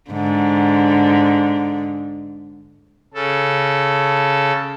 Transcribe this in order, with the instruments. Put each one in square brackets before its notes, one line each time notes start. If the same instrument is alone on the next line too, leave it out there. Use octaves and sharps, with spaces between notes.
[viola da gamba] G#2 D3
[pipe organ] C#3 A4